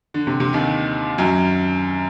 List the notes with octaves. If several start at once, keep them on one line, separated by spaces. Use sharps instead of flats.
D3
C3
C3
D#2 D#3
F#2 F#3